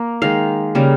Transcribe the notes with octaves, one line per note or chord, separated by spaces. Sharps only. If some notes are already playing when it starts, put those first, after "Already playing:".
Already playing: A#3
D#3 G#3 F5
C#3 G3 A#3